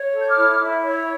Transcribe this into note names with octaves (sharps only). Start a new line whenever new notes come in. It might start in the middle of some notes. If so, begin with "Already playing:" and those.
Already playing: C#5
A4
G6
D6 F6
E4
E4
C#5